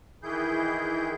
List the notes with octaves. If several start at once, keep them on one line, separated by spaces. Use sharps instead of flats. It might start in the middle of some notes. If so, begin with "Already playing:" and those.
D#3 E3 E4 G#4 G6